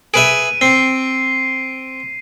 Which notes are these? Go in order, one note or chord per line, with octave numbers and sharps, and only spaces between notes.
G#4 B4 E5 D7 D#7
C4 C7